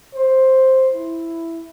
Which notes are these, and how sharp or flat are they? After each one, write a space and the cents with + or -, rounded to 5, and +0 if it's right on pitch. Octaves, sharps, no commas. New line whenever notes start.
C5 +5
E4 +5